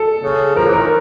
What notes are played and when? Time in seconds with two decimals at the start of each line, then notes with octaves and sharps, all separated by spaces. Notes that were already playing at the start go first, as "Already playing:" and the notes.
Already playing: A4
0.22 C#3
0.56 F3 A#4
0.67 E3
0.73 A#4
0.79 D#3